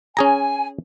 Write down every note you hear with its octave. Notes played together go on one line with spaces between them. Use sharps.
C#4 G#4 G#5 A#5